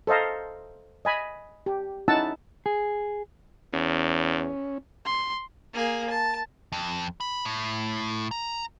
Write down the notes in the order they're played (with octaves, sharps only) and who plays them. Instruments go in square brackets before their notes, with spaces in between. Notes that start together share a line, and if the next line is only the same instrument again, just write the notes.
[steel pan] A4 C5 D#5 F5 A#5
D#5 G#5 B5
G4
C#4 D#4 E4 F#5 A5 E6
[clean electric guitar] G#4
[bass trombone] E2 [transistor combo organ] C#4
[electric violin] C6
[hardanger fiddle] A#3 G#4
A5
[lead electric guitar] F2
B5
A2
A#5